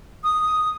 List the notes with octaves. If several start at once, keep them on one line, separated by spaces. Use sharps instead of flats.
D#6